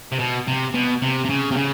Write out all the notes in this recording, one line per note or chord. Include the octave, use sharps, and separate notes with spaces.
C3
B2
C3
B2
C3
C3
C#3
C3
C#3